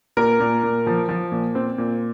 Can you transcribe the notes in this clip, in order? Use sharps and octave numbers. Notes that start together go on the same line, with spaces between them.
A#2 A#4
A#2
A#2
F3
F3
A#2
C4
A#2